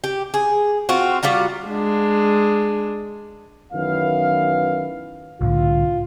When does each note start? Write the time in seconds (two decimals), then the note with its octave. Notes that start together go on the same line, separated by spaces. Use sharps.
0.04 G4
0.34 G#4
0.89 C4 F4 F#4
1.23 G3 F4 F#4 A#5
1.67 G#3 D4
3.73 F#2 D#3 E3 B3 F5
5.41 C2 A2 D3 F4